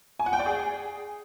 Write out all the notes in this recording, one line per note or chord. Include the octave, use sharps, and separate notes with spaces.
G#5
F#5
G5
D5
G#4